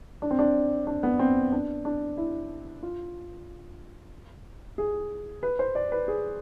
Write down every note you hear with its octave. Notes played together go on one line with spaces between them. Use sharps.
D4
C4
D4
D4
B3
C4
D4
D4
E4
F4
G#4
B4
C5
D5
B4
G#4